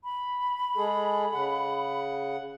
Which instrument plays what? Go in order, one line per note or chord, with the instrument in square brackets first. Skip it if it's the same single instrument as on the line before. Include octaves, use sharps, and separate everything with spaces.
[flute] B5
[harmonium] G#3 G#4 A4
C#3 F#5